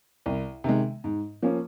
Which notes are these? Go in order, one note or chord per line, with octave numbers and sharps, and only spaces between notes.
C2
C3 D#3 G#3
G#2
F3 A#3 C#4